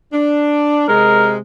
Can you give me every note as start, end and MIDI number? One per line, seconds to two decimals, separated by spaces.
0.12 0.85 62
0.88 1.37 48
0.88 1.37 56
0.88 1.31 70